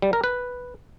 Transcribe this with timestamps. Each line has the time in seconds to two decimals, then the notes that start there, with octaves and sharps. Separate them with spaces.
0.02 G3
0.13 A#4
0.24 B4